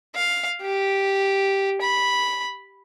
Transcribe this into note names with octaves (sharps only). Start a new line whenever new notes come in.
F5
G4
B5